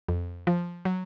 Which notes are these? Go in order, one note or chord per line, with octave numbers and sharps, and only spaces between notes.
F2
F3
F#3